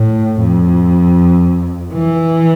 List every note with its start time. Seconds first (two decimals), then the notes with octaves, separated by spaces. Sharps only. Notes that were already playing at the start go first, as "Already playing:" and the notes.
Already playing: A2
0.41 F2
1.93 E3